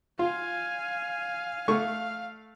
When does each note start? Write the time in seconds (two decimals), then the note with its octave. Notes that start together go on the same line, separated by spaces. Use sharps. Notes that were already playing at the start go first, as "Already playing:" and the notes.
0.19 F4 F5 G#5
1.68 A3 F5 C#6